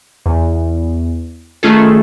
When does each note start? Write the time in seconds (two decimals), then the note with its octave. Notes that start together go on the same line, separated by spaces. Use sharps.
0.26 E2
1.63 D#3 A3 C#4 F4 G#4 A4